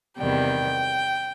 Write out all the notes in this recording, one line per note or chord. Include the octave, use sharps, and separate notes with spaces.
E2 C3 D#3 G3 G5